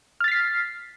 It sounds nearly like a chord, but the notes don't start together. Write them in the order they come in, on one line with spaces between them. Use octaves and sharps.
F6 A6 B6 C7